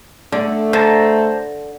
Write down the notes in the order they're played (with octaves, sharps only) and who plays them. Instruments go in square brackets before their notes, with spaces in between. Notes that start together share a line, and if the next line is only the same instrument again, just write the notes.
[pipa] D3 [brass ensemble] A3 [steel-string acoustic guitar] D5
[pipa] D3 [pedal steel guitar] C5 A5 A#5